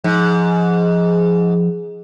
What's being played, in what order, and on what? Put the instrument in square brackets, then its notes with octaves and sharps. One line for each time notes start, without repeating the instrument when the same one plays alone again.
[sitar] G#2 [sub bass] F3